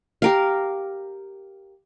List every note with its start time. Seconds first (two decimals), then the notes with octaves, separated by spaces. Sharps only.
0.22 G4 A#4 F5